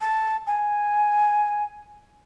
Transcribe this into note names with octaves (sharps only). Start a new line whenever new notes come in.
A5
G#5